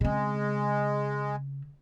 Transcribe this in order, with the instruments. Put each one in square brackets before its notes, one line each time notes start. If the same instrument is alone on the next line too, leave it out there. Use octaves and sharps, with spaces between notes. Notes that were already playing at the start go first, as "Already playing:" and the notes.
[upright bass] C#3 C4 [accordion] G#3